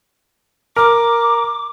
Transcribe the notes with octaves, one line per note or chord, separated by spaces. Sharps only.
A#4 D6